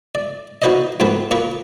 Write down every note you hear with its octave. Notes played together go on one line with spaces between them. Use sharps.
D5
D#4 F#4 B4 C5 D5 D#5
F2 G#2 B3 C4 A#4 B4
A#2 A#3 A#4 B4 C#6